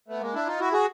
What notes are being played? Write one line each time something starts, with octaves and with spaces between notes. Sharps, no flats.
A3 B3
G#3 A#3
D4 E4
D#4 F4
E4 F#4
F#4 G#4